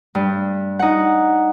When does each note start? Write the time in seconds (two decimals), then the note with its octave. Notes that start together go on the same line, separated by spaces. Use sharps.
0.15 G2
0.79 D#4 F#5